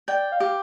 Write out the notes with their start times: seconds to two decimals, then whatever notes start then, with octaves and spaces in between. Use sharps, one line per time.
0.08 D5 G5
0.32 F5
0.40 G4